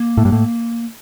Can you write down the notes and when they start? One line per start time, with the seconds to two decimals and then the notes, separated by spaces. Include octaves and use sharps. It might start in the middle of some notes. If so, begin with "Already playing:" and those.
Already playing: A#3
0.18 A2
0.25 G2
0.32 A2